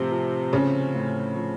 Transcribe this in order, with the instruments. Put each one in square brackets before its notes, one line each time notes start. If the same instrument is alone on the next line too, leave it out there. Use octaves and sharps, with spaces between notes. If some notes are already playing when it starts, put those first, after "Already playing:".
Already playing: [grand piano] A2 F3 C4 [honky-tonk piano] C3
[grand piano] F3
[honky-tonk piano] C#3 C#4 [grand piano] C4
[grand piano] A2
F3